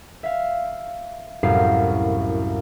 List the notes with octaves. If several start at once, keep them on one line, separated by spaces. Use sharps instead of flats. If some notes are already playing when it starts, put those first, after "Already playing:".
E5 F5
C2 F#2 A2 A#4 F5 C7